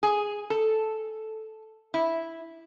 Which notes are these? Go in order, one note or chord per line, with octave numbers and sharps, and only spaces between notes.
G#4
A4
E4